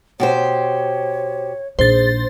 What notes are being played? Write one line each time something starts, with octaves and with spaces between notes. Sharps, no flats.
B2 G4 C5 C#5
A#1 D#4 G#4 C5 A6